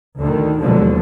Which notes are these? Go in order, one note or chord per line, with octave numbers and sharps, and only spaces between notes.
D2 D3 D#3
D#2 B2 D3 F3 F#3 G#3